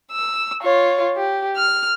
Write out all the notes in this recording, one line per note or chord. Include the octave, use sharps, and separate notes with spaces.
E6
F4 C#5
G4
F6